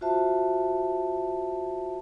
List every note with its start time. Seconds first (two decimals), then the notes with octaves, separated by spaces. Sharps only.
0.01 F4 F#4 C5 E5 A5